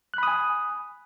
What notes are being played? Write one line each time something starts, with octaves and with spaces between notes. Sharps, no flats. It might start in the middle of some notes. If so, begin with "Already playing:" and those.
G#5 B5 D#6 F#6